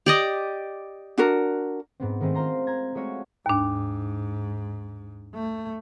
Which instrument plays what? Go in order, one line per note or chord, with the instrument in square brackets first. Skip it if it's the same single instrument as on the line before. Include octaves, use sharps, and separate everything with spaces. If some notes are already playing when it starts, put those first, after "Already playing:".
[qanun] G4 D5 D#5
[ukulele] D4 F#4 A#4
[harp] G#2 B3 C4
D#3 G#3 A3 C4
F4 C5 A#5 C6
A#5 G#6
G#3 A3 F4 F#4 C#5
[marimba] D#2 D4 [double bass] G#2
[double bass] A3